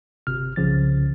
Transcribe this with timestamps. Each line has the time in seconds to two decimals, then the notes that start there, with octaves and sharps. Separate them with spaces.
0.27 G1 C3 F6
0.56 C2 C#3 F3 A6